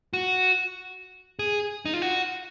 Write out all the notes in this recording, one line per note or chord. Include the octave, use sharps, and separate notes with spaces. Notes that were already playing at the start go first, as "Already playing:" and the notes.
F#4
G#4
D#4
F4
F#4